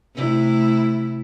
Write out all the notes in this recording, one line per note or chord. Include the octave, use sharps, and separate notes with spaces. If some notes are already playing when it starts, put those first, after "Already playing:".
C3 A3 E4